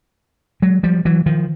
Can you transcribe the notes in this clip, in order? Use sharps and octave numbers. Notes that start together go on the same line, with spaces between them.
F#3 G#3
F3 G3
E3 F#3
D#3 F3